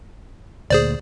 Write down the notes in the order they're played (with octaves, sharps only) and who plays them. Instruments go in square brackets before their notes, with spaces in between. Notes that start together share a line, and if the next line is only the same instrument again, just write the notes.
[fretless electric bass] D2 A#2 [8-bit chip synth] G#4 C5 D5